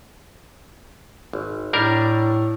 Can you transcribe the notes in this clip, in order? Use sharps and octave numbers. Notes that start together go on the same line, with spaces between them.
G#1
A2 G3 D4 A#4